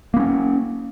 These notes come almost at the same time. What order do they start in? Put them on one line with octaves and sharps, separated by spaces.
A#3 B3 C#4